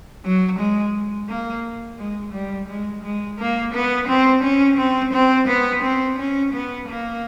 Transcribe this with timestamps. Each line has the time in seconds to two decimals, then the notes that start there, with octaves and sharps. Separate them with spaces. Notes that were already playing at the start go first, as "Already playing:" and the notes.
0.25 F#3
0.59 G#3
1.29 A#3
1.98 G#3
2.33 G3
2.68 G#3
3.03 G#3
3.39 A#3
3.73 B3
4.08 C4
4.44 C#4
4.78 C4
5.13 C4
5.47 B3
5.82 C4
6.18 C#4
6.53 B3
6.88 A#3